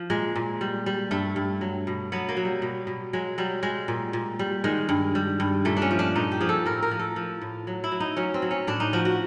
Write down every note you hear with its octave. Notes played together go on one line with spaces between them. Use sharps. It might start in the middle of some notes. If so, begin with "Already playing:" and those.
Already playing: F3
A#2 G#3
A#2
G3
G3
G2 A3
G2
F#3
B2
F#3 B3
A#3
F#3
G3
B2
B2
F#3 G#3
F#3 G3
G3 G#3
A#2
A#2
G3
D#3 G#3
G2
G3
G2
A#2 A3
D4
C#4
F3
D4
A#2 D#4
G4
F3 G#4
A4
A2 A#4
A#4
F3
A4
F3
A2
F#3
E4
F#3
D#4
F#3 C#4
C4
F#3
C#4
A2 D4
D#4
F3 F#4
F#4